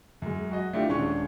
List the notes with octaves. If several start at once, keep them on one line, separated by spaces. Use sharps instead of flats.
F#2 G#3
F#4 D#5
A3 D4 E4 F4 G4
D#1 G#3 C#4 D4 C#6